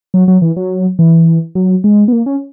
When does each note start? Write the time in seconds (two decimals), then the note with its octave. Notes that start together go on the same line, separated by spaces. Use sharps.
0.14 F#3
0.28 F#3
0.42 E3
0.57 F#3
0.99 E3
1.55 F#3
1.84 G#3
2.08 B3
2.13 A#3
2.26 C#4